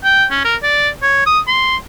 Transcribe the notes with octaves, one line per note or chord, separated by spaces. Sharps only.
G5
C#4
A#4
D5
C#5
D#6
C6